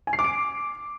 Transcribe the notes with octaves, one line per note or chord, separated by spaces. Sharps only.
G#5
C7
D6
D7